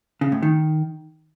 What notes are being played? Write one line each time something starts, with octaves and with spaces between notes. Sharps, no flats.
C#3
A2
D#3